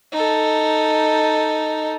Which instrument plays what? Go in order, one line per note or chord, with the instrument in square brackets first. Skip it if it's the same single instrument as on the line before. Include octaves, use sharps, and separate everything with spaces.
[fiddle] D#4 A4